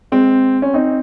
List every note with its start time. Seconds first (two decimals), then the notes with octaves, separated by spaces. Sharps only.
0.12 G#3 C4
0.62 C#4
0.74 C4 D#4